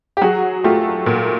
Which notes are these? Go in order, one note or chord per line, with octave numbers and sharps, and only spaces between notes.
G4
F#3 F#4 G#4
A3 F4 G4
A#2